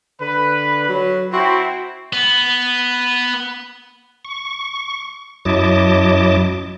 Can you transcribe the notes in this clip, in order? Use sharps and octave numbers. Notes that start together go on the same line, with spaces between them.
D3 B4
F#3
C4 E4 F#4
B3
C#6
F#2 F#3 E4 D#5 A5 D6